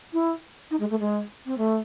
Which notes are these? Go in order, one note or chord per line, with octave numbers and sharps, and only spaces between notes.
E4
D#4
G#3
A3
G#3
C4
A3